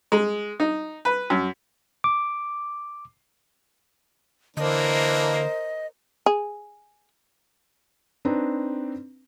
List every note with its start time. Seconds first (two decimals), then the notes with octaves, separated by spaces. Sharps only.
0.12 G#3
0.60 D#4
1.05 B4
1.30 F#2
2.04 D6
4.57 D3 E3 A#3 D4 A#4 C5 D#5
6.26 G#4
8.25 C4 D4 D#4 B4 A#5